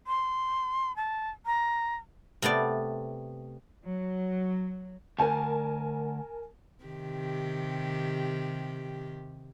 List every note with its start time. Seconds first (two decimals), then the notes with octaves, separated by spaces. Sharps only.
0.07 C6
0.96 A5
1.46 A#5
2.42 C3 A3 B3 D5
3.84 F#3
5.19 D2 A#4 G#5 A5
6.84 C3 D#3 G4